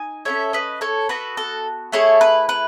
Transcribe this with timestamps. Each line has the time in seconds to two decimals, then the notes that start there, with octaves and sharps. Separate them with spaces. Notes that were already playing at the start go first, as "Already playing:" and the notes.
Already playing: D#4 G#5
0.25 C#4 E4 A4 C#5 E5
0.53 B4 D#5
0.81 A4 C#5
1.09 B3 F#4 A4 B4
1.37 A4
1.92 A3 E4 G#4 A4 C#5
2.21 B4
2.49 B4